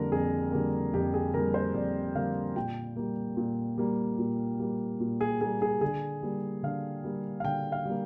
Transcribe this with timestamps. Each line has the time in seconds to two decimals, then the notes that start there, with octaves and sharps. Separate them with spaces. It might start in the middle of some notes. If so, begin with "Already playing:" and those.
Already playing: F2 D3 G3 A#3 A#4
0.12 F2 G#4
0.52 D3 G3 A#3
0.93 F2 G4
1.14 G#4
1.34 D3 G3 A#3 A#4
1.54 C5
1.75 F2 D5
2.15 D3 G3 A#3 F5
2.56 A#2 G5
2.96 G3 A#3
3.37 A#2
3.78 G3 A#3
4.19 A#2
4.59 G3 A#3
5.00 A#2
5.21 G#4
5.41 G3 A#3 G#4
5.62 G#4
5.81 D3 G#4
6.23 G3 A#3
6.63 D3 F5
7.04 G3 A#3
7.40 F5
7.44 D3 G5
7.72 F5
7.85 G3 A#3